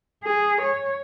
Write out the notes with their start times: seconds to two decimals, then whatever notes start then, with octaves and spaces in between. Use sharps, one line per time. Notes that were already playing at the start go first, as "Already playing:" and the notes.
0.24 G#4
0.62 C#5